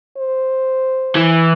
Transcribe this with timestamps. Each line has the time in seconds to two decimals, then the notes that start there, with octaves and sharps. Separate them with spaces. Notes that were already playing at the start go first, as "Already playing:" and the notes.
0.17 C5
1.15 E3